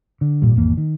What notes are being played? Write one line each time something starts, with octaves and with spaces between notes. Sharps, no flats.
D3
G#1 A#2 G3
G#1 E2 A#3
D#3